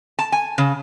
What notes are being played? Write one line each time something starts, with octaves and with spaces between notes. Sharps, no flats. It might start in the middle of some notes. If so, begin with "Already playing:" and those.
A5
G#5
C#3